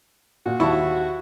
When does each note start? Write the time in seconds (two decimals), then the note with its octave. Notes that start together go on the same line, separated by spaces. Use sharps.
0.46 A#2 F#4
0.60 D#2 E4 A5 C#6